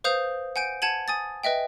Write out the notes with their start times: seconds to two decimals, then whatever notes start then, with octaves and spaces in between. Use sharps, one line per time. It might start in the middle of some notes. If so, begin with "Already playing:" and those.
0.04 B4 C5 F5 D#6 G6 F7
0.56 F#5 G#5 G6 D7
0.82 F#5 A5 G#6 D#7 F#7
1.08 G#5 D#6 A6
1.44 B4 D#5 E5 G5